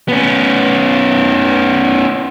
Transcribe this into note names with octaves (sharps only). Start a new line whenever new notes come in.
B3 C#4